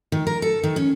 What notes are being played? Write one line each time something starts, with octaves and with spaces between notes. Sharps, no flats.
D#3
A#4
A4
D#3
C#4